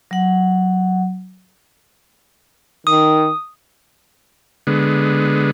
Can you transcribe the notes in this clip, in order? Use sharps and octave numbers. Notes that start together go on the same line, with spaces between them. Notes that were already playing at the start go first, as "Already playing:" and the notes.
F#3 F#5
D#3 D#6
D3 G#3 B3